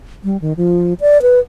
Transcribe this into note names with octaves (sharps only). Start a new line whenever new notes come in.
G3
D#3
F3
D5
B4